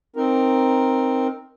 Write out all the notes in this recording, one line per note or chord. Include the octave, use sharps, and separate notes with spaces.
C4 D#4 A#4